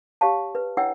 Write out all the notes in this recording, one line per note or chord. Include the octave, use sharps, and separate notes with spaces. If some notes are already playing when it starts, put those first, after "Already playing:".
G4 C#5 F5 A5
B4
D4 E4 C#5 F#5 G5 E6